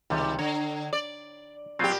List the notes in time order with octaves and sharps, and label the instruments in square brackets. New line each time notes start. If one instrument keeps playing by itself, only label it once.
[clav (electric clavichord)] C#2 C3 G3 [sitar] D#3
[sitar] D3 [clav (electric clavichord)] C#5
[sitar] D5
[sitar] A#2 G4 [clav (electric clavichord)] F#3 C4 F4